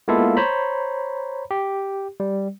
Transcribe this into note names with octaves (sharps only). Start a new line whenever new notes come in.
G#3 A#3 B3 E4 F4 A4
C5 C#5 A#5 B5
G4
G3